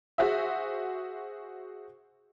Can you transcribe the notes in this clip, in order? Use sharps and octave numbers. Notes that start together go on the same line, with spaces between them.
F#4 G#4 C5 E5